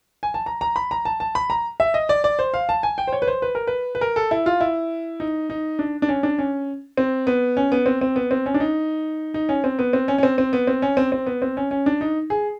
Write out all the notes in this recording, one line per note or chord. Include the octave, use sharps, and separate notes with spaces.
G#5
A5
A#5
A#5
B5
A#5
A5
A5
B5
A#5
E5
D#5
D5
D5
C5
F5
A5
G#5
G5
C5
C#5
B4
C5
B4
A#4
B4
B4
A#4
A4
E4
F4
E4
D#4
D#4
D4
D4
C#4
D4
C#4
C4
B3
C#4
B3
C4
C4
B3
C4
C#4
D4
D#4
D#4
C#4
C4
B3
C4
C#4
C#4
C4
C4
B3
C4
C#4
C4
C4
B3
C4
C#4
C#4
D4
D#4
G#4